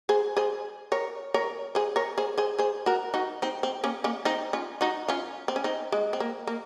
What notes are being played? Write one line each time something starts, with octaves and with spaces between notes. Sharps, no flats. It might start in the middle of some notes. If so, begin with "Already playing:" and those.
G#4 C5
G#4 C5
A#4 C#5
A#4 C#5
G#4 C5
A#4 C#5
G#4 C5
G#4 C5
G#4 C5
F#4 A#4
D#4 F#4
C4 D#4
C4
A#3 C#4
A#3 C#4
C4 D#4
C#4 F4
D#4 F#4
C#4 F4
C4
C#4
C4 D#4
G#3
C4
A#3
A#3